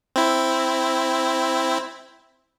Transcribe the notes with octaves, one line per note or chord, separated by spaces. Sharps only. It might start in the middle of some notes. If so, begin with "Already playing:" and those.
C4 E4